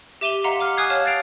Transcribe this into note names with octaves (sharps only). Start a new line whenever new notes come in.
G4 E5 D6 D#7 F7 G7
D#5 F5 F#5 A#5 C6 B6
F#5 D6 F6
G#5 C#6 D#6 F#6 G#6 C7
C#5 F5 A5 F6 G#6
F#6 A6 C7 D7 F7